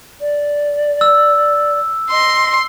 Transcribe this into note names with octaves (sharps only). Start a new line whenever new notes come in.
D5
E6
D#5 C6